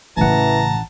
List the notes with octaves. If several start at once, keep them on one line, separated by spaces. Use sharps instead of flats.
A1 A2 C#3 E3 F#5 A5 A#5